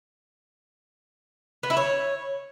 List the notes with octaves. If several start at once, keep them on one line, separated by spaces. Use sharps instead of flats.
B3
E4
C#5